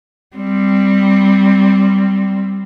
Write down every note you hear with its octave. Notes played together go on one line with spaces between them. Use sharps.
G3 C4